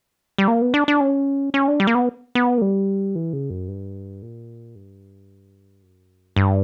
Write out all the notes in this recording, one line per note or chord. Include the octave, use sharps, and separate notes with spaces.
G3
A#3
B3
D4
D4
C#4
C#4
D4
G3
A#3
B3
B3
A#3
G3
E3
C#3
F#2
G2
A#2
G2
F#2
G2